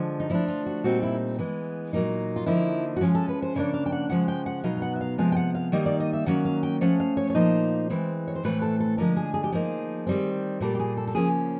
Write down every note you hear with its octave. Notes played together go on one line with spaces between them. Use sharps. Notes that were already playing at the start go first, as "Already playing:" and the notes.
Already playing: D3 F3 G#3
D#4
F3 A3 D4 E4
F4
F#4
A#2 G3 C4 D#4 F#4
E4
E3 G#3 B3
A#2 F#3 A#3 D#4
F4
D3 F3 A#3 D#4 E4
F#4
F3 G#3 C#4 F4
A4
B4
C5
C#3 F3 A#3 D4 C#5
F5
G5
F#5
C#3 F3 G#3 F#5
G5
F#5
B2 F#3 B3 D#4 F5
F5
F#5
E5
F5
C3 F3 G#3 B3 F5
G5
F#5
F5
D#3 G3 A#3 D#4 D#5
D5
D#5
E5
D#3 F#3 A#3 C#4 F#5
F5
G5
F3 A3 C#4 F#5
F5
C#5
C#5
A#2 F3 A#3 D#4 C5
E3 G#3 C4
C#5
C5
A2 E3 A3 C4 B4
A4
A4
D3 F3 G#3 A#4
G#4
G#4
G4
F3 A#3 D#4 G#4
D#3 G3 C4
A#2 G3 A#3 A4
G4
G#4
A4
A4
C#3 F3 A#3 C#4 G#4